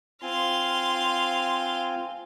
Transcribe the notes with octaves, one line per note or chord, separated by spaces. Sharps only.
C4 F4 F5 G#5 C6